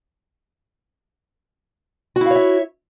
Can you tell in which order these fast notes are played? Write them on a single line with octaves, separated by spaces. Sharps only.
F#4 E4 F5 C#5 E5